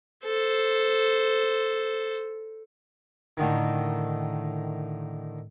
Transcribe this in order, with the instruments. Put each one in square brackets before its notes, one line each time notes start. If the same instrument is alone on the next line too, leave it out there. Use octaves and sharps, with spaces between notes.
[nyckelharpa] A4 C5
[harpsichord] A2 D3 D#3